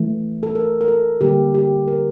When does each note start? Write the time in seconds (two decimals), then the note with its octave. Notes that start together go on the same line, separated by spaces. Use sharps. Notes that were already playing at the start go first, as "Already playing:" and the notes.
Already playing: E3 A3
0.43 A4
0.55 A#4
0.81 A#4
0.88 A4
1.21 D3 G3 A#3 G4
1.54 G4
1.88 A#4